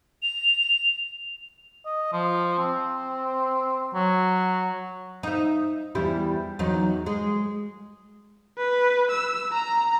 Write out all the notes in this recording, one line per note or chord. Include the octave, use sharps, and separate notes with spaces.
F7
D#5
F3
C4
F#3
D#4 E5
E2 G3 E4
E2 F#3 D#4
G#3
B4
E6
A#5